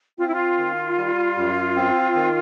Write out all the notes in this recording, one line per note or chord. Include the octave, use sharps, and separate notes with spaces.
C4 F4
E4
F4
D#3
G3
F#2
C4
D#3